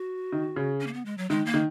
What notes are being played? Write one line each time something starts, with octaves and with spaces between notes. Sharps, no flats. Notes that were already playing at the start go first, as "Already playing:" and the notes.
Already playing: F#4
D#3
C#3
C#4
A#3
B3
G#3
F#3
D#3 G#3
A#3
D#3